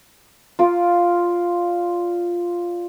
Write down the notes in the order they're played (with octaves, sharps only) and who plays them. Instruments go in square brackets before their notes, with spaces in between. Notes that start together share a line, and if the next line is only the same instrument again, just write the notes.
[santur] F4 D5